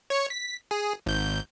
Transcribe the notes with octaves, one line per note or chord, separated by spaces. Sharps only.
C#5 C#7
B6
G#4
G#1 G6